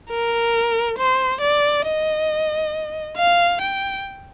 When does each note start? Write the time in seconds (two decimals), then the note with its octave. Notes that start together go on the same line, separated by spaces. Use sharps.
0.10 A#4
0.98 C5
1.41 D5
1.86 D#5
3.17 F5
3.61 G5